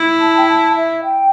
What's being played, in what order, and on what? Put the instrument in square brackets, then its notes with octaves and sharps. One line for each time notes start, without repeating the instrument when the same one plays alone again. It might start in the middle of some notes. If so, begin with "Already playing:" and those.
Already playing: [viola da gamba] E4
[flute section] A5
G5
A5
E5
G5